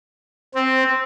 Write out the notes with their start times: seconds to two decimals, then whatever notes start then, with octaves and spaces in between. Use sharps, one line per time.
0.55 C4